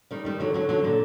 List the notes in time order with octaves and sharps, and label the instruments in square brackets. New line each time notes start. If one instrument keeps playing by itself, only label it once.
[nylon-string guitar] D#3 G3
D#3 G3
D3 F#3
D3 F#3
D3 F#3
A#2 D3